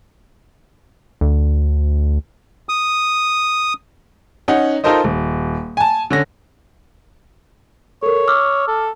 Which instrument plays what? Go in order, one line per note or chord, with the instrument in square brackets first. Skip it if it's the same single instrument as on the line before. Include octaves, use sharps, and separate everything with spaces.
[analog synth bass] D2
[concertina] D#6
[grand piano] C#4 D#4 F#5
D#4 F4 A4 A#4 C5 D#5
D#1
G#5 A5
D3 C#4 A#6
[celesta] A4 A#4 [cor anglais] C#5
[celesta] D6 E6 F6
[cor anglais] A4